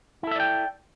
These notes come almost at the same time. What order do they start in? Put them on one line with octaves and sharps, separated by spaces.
E4 A4 E5 D5 G5